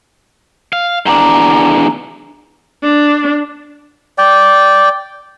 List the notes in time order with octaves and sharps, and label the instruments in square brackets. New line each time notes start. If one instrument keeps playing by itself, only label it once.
[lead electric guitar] F5
[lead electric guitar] E2 D4 [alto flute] A#5
[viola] D4
[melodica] D5 G5